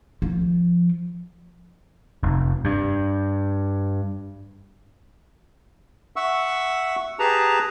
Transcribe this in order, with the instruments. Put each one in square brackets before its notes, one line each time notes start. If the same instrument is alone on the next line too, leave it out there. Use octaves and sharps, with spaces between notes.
[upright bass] F3
[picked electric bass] F1
G2
[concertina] E5 F#5 C#6 E6
G4 G#4 B4 A5 A#5